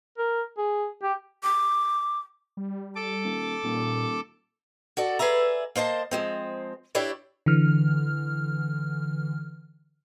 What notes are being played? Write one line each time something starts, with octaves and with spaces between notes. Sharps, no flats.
A#4
G#4
G4
D6
G3
A4 D6
D#1
D#1 A#2
F#4 A4 D5
G#4 B4 D5 E5 A#5
A#3 C5 D#5 A5
F3 G#3 C4
D4 E4 G4 C#5 D5
D3 E3 F6